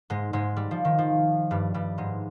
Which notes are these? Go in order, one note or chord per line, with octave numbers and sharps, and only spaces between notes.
G#2 G#3
G#2 G#3
G3
F3
D#3
F3
G2 G3
G2 G3
G#2 G#3